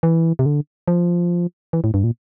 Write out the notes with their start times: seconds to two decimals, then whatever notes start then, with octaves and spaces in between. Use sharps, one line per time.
0.03 E3
0.39 C3
0.46 D3
0.88 F3
1.73 E3
1.84 A2
1.94 G2
2.04 A#2